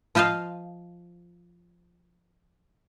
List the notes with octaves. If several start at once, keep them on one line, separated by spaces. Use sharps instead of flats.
F3 F4 C5 D#5 F5